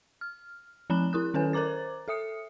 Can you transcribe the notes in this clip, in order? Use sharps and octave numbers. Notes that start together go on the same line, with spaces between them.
F6
F3 C4 A#5 B5 F#6 E7
E4 A#4 D#6 F#6
D#3 C#4 A4 B4 C#5 G#5
A#4 C5 A#5 D6 A6
A4 E5 D#6 C#7